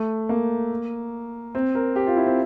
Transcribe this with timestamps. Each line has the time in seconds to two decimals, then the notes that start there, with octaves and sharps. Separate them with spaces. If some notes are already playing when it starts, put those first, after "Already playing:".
Already playing: A3
0.29 A#3
1.55 C4
1.75 A#4
1.96 G4
2.07 F4
2.17 E4
2.27 C4